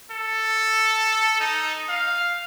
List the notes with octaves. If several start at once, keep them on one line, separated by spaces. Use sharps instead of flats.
A4
D#4
F5